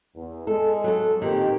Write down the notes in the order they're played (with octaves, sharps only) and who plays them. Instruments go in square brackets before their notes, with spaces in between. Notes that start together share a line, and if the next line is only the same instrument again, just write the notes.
[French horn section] E2
[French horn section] G#3 [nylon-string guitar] A4
[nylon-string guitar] F#3 A4
[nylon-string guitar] A#2 D#3 [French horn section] C4 D#4 G4